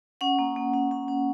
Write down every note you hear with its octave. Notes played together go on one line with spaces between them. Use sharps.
C#4 F#5
A#3
A#3
C#4
C#4
C#4